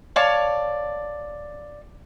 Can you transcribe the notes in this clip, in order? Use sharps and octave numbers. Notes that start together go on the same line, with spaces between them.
C#5 D5 F5 A5